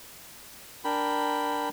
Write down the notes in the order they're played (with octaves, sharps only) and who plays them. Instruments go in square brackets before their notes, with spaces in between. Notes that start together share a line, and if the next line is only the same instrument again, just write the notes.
[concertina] D4 A#4 G5 B5